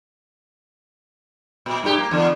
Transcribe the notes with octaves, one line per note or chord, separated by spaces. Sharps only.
A#2
G2 A#2 G4
A#3
E2 D3